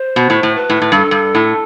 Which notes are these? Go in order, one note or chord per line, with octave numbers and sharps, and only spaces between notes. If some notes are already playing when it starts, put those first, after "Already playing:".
Already playing: C5
B2
A2
A2
B4
A2
A2
G2 A4
G2
A2